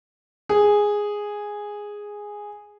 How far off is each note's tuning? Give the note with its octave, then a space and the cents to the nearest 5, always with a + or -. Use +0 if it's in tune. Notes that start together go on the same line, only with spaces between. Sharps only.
G#4 -5